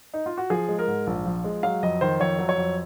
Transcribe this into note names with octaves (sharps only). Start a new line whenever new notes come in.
D#4
F4
F#4
F3 G#4
G#3
A#4
G#2
A#1
F3
G#3
F#3 F5
F2 D#5
D#3 C5
F2 C#5
F#3
C#5
F2